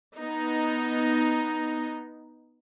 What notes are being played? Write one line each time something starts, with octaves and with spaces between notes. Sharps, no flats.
B3 D#4